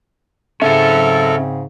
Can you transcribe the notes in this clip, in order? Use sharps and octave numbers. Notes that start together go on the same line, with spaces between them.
G#2 C#3 C4 C#4 A4 E5 F#5